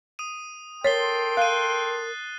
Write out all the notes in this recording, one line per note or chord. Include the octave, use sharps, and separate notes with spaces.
D#6 D#7
A4 A#4 C#5 G5 C6 A6 C7 G7
F5 F#6 D#7